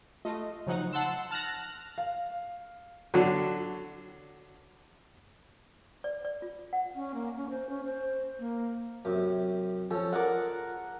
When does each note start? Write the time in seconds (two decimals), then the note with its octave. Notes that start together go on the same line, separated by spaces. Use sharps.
0.25 A3 F4 D#5
0.67 C#3 F3 F#3 D#4 F#5
0.93 F#5 A5 C6 E6
1.31 A5 F6 F#6 A#6
1.98 F5
3.14 D3 F#3
6.04 D5
6.25 D5
6.42 F4
6.73 F#5
6.95 C#4
7.14 A#3
7.37 C#4
7.50 C5
7.69 C#4
7.85 C5
8.39 A#3
9.05 F#2 C3
9.91 F3 C#4 A4
10.13 F4 G#4 A#4 D5 F#5